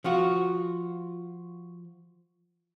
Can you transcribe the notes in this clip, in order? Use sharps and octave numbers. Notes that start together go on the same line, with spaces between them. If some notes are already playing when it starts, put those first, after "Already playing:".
F3 F4 F#4